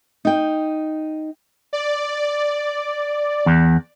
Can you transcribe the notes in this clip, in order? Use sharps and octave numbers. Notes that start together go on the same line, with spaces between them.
D#4 G5
D5
E2